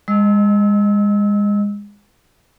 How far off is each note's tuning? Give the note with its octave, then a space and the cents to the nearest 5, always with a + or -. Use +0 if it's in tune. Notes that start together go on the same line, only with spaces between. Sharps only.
G#3 -25 D#5 +0 E6 -25